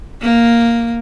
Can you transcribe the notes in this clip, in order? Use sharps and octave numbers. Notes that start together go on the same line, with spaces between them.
A#3